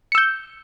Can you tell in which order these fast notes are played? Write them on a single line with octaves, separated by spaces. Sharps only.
C#7 E6 G6